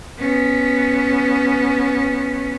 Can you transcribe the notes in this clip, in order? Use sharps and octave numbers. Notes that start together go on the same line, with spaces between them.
B3 C#4